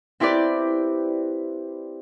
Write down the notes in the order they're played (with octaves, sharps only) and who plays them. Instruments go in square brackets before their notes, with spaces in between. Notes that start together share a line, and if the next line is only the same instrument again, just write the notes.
[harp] C4 E4 G4 B4 D5